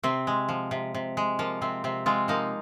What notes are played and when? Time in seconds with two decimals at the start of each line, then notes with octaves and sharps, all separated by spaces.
0.03 C3 C4
0.27 G#3
0.49 F3
0.71 C3
0.94 C3
1.17 G#3
1.39 F3 A#3
1.61 C3 C4
1.84 C3 C4
2.06 G#3 C4 F4
2.28 F3 A#3 D#4